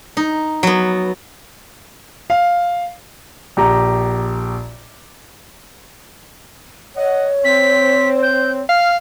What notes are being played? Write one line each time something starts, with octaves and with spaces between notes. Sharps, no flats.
D#4
F#3 B3
F5
A#1 G4 A#5
C#5 D#5 F#5
C4 B6
G6
F5 F6